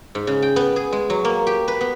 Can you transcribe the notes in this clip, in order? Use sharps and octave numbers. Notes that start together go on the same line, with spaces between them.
G#2
C#3
G5
B3
G#4
G#3
F#3
A#3
G4
B4
B3